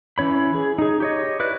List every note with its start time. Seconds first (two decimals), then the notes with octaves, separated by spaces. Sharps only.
0.18 E3 C#4 C#5 B5
0.54 G#4
0.78 D#4 G#4
1.00 G4 C#5 D#5
1.40 E4 B4 D5 F#6